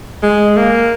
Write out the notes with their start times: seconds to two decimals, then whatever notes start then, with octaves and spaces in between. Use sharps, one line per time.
0.23 G#3
0.57 A#3